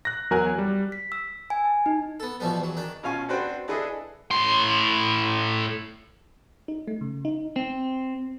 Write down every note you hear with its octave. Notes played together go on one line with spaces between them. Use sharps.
F#6 A#6
E2 F#3 A#4 G#5 F#6
G3
B6
E6
G#5
A5
D#4
B3 A4
B2 E3 F3 G3 B3
E2 F#3
D#3 D4
B2 C#4 F4 F5 G#5 C#6
C4 D4 F#4 B4 C5 G5
D4 E4 G#4 A4 B4 D#5
A2 C6
D#4
A3
C#3
D#4
C4